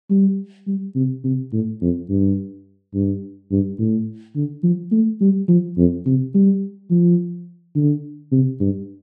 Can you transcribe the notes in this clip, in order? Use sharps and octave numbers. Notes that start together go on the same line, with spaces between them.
G3
G3
C3
C3
A2
F2
G2
G2
G2
A2
D3
F3
A3
G3
F3
F2
C3
G3
F3
D3
C3
G2